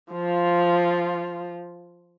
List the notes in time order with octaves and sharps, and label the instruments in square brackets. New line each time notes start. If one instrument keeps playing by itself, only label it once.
[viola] F3 F4